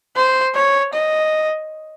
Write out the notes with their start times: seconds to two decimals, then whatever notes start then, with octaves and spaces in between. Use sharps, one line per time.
0.16 C5
0.55 C#5
0.94 D#5